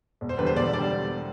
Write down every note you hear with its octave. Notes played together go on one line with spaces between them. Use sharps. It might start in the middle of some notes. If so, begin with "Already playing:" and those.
E1
C5
E2 D3 G3 B4
C5
E1 D5
D3 G3 D5